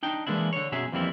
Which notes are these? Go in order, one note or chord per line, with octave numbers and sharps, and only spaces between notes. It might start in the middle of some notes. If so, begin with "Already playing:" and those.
D4 D#4 G5
E3 G#3 A#3 D4 E4
D3 C#5
F#2 B2 F#3 G#4 E5
F2 E3 G3 A#3 C4 E4